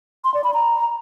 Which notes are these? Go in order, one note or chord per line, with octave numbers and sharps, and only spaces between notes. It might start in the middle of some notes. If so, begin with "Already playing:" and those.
C6
D5
B5
A#5